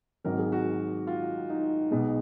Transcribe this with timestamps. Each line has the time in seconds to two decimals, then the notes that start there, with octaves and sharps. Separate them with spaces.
0.24 G#1 G#2 F#3 A#4
0.38 G#4
0.52 F#4
1.07 F4
1.50 D#4
1.91 B1 B2 G#3